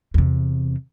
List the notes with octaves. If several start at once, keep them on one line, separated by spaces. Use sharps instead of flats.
E2 C3